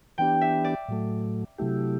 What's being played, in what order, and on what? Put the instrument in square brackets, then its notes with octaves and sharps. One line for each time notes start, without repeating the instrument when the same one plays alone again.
[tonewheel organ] E3 B3 D4 G4 [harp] G5
[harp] E5
D5
[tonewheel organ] A2 F#3 A3
C3 F#3 A3 E4 G4